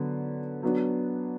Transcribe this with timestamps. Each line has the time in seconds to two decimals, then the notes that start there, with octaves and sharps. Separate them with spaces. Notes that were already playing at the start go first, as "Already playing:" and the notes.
Already playing: D3 F#3 B3
0.63 F#3 B3 D4